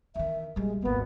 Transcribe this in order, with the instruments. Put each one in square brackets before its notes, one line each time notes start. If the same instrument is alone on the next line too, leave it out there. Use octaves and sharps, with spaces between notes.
[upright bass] E2 D#3 [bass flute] E5
[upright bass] A#1 G3 [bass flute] G#3
[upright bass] D#1 G#1 [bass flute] A#3 [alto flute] B3